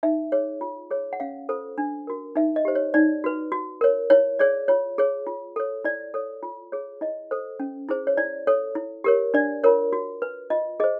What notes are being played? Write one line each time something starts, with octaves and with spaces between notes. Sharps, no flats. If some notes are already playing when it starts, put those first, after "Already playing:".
D#4 E5
G#4 C#5
F4
G#4 C#5
F#5
C#4 F5
F4 A4 C5
D4
F#4 A#4
D#4 E5
D#5
G4 C5
C#5
D#4 D5
F#4 B4
F#4
A#4 C#5
E4 C#5
G#4 C#5 D5
F4 C#5
G#4 C#5
F4
A4 C#5
E4 D5
A4 C#5
F4
G#4 C#5
E4 D#5
A4 C5
C#4
E4 G#4 C5
C#5
E4 D5
A4 C#5
E4
G4 A#4 C#5
D4 D5
F4 A#4 C#5
F#4
B4
F4 D#5
G#4 C5 D#5